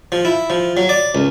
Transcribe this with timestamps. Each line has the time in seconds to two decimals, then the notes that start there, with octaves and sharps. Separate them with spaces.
0.12 F3
0.25 E4
0.50 F3
0.77 F#3
0.89 D5
1.15 C#2